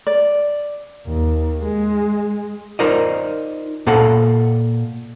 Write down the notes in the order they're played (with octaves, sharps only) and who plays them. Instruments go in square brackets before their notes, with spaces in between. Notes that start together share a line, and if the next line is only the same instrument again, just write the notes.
[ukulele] D5
[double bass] D#2
G#3
[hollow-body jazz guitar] D#4 F4 A#4 C5 D5 D#5
A#2 A#3 A4 F5 F#5